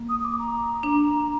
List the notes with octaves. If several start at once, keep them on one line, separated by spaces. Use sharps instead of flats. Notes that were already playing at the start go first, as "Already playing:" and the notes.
Already playing: A#3
D#6
D#6
D6
A#5
D4